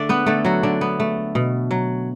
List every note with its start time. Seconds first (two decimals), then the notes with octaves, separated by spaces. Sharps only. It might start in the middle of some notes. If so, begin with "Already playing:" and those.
Already playing: D3 A3 D4 D5
0.09 B3 B4
0.26 D3 A3 A4
0.45 F#3 F#4
0.63 D3 D4
0.81 B3
1.00 A3
1.35 B2
1.71 F#3